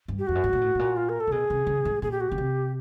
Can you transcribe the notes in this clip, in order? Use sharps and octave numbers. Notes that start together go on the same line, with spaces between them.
G2
G4
F2 F#4
F#2
G#2
A#2
A2
A2
A#2
F4
A#4
A4
C3
B2 G#4
C3
C#3
G#2
A#2 G#4
G4
F#4
C#3 G4
C3